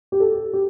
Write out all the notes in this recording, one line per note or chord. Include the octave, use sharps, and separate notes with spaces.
G4
A4
G4